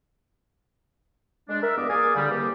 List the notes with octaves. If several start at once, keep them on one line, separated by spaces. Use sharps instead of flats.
G#3 D4
A#4 E5
E2 G2 B3 D#5 D6
A#3 G#4 D5 F5 G#5 D#6
D3 G3
C2 E3 A#3 G4